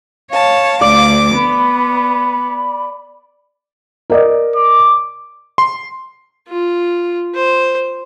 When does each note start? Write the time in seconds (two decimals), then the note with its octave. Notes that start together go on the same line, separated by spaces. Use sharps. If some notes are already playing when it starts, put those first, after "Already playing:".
0.32 C#5 F5 A5
0.81 D2 D5 D6
1.34 B3 B5
4.10 A#4 D5 D#5
4.56 D6
5.58 C6
6.48 F4
7.35 C5